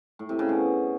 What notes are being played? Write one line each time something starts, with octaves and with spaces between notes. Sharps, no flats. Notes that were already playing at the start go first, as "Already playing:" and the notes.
A2
C3
C#3
B2